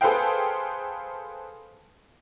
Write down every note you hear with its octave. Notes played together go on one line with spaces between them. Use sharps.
G#4 A4 B4 C5 F5 G5